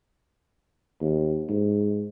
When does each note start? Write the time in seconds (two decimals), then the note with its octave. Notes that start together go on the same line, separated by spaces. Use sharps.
1.01 D#2
1.49 G#2